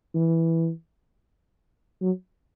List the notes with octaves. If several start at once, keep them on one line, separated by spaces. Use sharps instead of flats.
E3
F#3